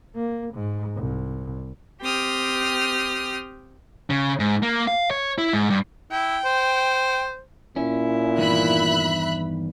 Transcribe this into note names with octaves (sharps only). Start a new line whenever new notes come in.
A#3
G#2
C2
C4 G4 G5 D#6 F6
C#3
G#2
A#3
F5
C#5
E4
G#2
G2
E4 G5
C5
A#2 C#4 E4
E2 G2 D#3 E5 B5 F#6